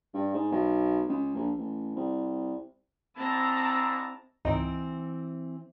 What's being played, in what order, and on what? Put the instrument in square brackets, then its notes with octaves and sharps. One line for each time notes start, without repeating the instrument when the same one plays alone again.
[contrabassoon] G2
G#2
B1
C#2
A#1
A1
C2
[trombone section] G#2 D4 E4 [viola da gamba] C4 [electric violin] A5 A#5
[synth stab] G#1 C#2 D#4 [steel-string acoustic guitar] E3 C4 C5